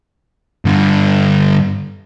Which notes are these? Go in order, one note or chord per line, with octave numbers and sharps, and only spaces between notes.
G2 D3